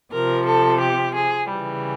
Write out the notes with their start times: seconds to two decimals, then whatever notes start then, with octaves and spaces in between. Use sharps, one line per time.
0.13 C3 F3 A#4
0.47 A4
0.81 G4
1.16 G#4
1.50 C#3 E3 G3